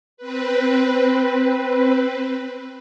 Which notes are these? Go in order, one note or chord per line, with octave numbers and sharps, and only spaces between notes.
C4 B4